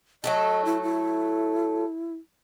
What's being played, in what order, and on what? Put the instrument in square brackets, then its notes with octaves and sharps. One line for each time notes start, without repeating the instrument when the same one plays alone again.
[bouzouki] F#3 A3 A4 [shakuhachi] D#5
[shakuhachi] E4
E4